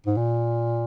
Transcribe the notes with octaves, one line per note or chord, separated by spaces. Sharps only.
G#2
A#2